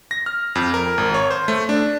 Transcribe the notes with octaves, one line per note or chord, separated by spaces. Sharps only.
A#6
F6
F2
A#4
G#1
C#5
C5
A3
D4